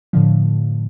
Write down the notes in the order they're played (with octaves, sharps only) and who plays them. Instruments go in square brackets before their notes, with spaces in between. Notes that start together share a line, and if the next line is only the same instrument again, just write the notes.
[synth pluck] A2 D3 F3